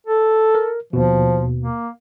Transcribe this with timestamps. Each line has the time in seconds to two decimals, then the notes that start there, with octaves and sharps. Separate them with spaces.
0.07 A4
0.55 A#4
0.93 D#2 B2 F3
1.61 A#3